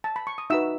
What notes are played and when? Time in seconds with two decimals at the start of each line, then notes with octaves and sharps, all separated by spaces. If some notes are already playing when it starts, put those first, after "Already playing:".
0.04 A5
0.16 B5
0.27 C#6
0.38 D#6
0.50 D#4 F#4 B4 E5 E6